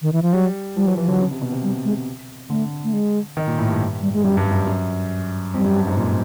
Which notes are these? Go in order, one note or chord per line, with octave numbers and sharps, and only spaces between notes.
D#3
E3
F3
F#3 G3
F3 G3
E3 F#3
E3 F3
D3 F#3
C#3
C3
B2
C3
G3
G#3
D3 A3
A3
G#3
D#3
A#2
A2
G2
G3
G#3
F#2 G3
G2
F#2
F#2
F2 G3
F#2
G2
G#2
A#2